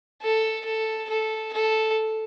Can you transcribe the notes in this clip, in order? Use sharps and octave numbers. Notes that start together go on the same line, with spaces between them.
A4
A4
A4
A4